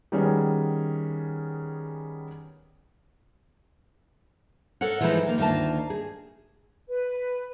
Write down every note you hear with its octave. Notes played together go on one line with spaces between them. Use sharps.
D#3 G3 B3 C#4 G#4
A4 A#4 C#5 F#5
E3 F3 G#3 D#4 E4
D#3 A#3
D2 D#3 A#3 F4 A5
G#4
B4